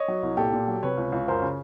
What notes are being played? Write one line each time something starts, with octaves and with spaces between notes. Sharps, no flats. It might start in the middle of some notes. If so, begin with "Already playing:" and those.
Already playing: C#5 D#5
F#3
C2
A#2 G4 A4
A#2
F#3
C3 B4 C#5
C#2
C#2
F#2 A#4 C5
C#3